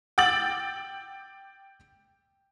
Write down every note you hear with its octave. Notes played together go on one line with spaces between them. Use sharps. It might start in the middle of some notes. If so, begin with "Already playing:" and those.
G5 D6 E6 A6 F#7